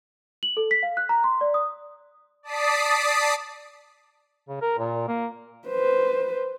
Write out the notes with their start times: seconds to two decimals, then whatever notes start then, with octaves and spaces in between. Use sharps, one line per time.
0.43 F#7
0.57 A4
0.71 B6
0.83 F5
0.97 F#6
1.09 A#5
1.24 C6
1.41 D5
1.54 D#6
2.43 D5 A5 D#6 B6 C7 D7
4.49 C#3
4.61 A#4
4.79 A#2
5.08 A#3
5.68 B4 C5